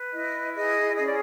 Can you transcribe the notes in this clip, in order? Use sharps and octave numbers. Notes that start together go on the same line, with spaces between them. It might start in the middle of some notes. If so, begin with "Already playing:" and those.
Already playing: B4
E4 D#5
G#4 D#5
C#4 D#5
D5